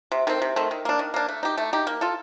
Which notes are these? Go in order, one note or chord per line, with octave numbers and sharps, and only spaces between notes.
C3
D#3 A3 C4
C3
D#3 A3 C4
D#3
A#3 D4
D#3
A#3 D4
A3
D#4 G4
A3
D#4 G4
A#3
F4 A4